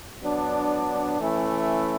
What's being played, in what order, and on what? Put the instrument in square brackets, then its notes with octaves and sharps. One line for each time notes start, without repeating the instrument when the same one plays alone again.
[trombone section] F#3 B3 D4
E3 A3 C#4 E4